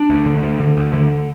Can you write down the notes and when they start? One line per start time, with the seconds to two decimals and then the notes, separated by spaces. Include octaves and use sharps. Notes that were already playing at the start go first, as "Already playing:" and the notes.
Already playing: D4
0.10 D2
0.26 D3
0.43 D2
0.60 D3
0.77 D2
0.93 D3